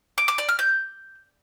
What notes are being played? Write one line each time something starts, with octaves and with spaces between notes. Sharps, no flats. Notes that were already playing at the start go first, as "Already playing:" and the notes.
D6
D6
D5
F6
G6